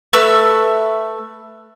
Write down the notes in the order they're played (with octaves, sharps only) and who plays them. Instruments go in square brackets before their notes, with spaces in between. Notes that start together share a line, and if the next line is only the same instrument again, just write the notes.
[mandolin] A3 B4 E6